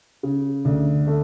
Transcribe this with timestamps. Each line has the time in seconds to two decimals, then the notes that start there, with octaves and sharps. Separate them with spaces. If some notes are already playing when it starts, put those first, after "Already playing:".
0.23 C#3
0.65 D2
1.07 A3